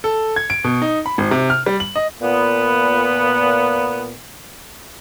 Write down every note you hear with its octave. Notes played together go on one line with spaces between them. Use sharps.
A4
G#6
D7
B2
D#4
B5
G#1
C3
F6
G3
F#7
D#5
A#2 B3